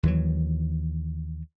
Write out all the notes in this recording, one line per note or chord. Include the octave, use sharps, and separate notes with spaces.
D#2 E3 F#3